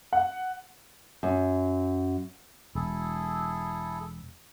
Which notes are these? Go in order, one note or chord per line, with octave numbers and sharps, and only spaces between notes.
F#5
F#2
E1 E4 G#4 A4